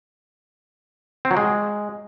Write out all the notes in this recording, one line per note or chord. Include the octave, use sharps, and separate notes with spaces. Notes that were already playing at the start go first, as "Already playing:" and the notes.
C4
F#3
G#3